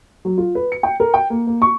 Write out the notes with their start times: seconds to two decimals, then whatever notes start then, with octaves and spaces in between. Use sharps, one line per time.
0.25 F#3
0.38 F4
0.55 B4
0.72 C#7
0.83 G5
1.00 A#4
1.14 G5
1.30 A#3
1.47 A#3
1.62 C#6